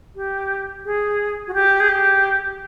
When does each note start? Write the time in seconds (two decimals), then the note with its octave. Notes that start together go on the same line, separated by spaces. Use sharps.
0.16 G4
0.85 G#4
1.47 F#4
1.54 G4
1.80 G#4
1.89 G4